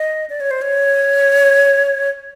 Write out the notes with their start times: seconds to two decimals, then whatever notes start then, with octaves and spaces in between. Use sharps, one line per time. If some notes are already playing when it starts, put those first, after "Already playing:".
Already playing: D#5
0.30 D5
0.40 C#5
0.51 C5
0.62 C#5